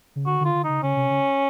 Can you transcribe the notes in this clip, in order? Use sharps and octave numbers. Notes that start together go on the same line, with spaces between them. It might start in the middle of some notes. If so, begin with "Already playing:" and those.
C#3
D3 F#4
D3 F4
D3
C#3 D#4
C#3 C#4
C3
C#3